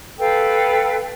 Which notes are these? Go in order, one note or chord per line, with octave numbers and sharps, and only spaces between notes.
A4 B4 F5 G5